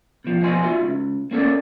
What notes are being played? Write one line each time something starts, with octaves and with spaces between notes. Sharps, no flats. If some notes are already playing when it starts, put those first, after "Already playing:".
B2 F3
B2 F3 C5 D#5 G#5 C6
D#4 F4 F#4 E5
C#2
A#3 C#4 A4 C#5 D5